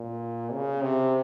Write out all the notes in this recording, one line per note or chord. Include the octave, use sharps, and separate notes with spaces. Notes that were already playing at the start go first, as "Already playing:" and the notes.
Already playing: A#2
C#3
C3